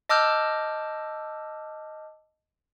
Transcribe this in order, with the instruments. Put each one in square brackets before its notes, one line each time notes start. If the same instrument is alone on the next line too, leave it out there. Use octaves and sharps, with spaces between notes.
[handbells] D#5 A5 D6 E6 F6 G6